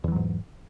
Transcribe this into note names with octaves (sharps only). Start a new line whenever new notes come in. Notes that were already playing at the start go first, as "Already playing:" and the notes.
E2 G#2 E3 F#3